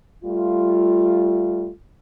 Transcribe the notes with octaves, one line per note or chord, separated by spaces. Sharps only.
G3 A3 F4